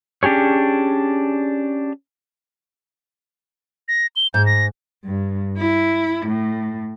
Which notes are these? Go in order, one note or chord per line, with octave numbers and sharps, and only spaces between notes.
C#4 D4 G4 G#4 C#5
A#6
G7
G#2 G6
A#6
G2
E4
A2